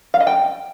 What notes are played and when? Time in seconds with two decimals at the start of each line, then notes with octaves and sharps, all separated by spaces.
0.14 F5
0.20 D#5
0.27 G5